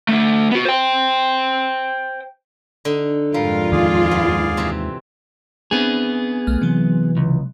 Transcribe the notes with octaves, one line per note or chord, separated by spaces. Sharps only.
A3 D4
B3 F#4
C5 G5
D3 D#4
F2 G#2 G3 F4 A#4 F5
D#2 D#3 G#3 G#4 D5 F5
B3
C3 E3 C4
B3 C4 D4 G#4
B1 A3 F6
C3 E3 F#3
C#2